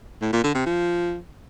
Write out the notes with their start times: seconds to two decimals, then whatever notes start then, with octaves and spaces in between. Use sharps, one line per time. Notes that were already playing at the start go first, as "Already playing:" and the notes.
0.22 A2
0.33 A#2
0.44 D3
0.55 C3
0.66 F3